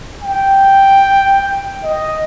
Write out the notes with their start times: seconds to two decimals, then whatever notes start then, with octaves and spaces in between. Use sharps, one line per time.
0.22 G5
1.84 D#5